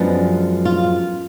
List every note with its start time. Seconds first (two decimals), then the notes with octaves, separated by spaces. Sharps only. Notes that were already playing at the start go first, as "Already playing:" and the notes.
Already playing: F#2 F3 G#3 B3 D4
0.65 F4